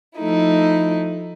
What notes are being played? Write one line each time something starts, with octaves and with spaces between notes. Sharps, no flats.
F3 A3 D#4 E4